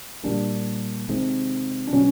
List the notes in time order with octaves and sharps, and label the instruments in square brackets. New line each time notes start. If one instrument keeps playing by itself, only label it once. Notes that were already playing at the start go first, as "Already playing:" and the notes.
[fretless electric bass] A#2 G3 A#3 [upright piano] D4
[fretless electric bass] C3 D#3 G#3 C4
[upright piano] D4
[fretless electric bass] B2 F#3 B3 [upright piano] C#4